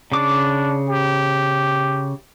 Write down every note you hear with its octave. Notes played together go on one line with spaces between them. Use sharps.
C#3 D4 D6
G4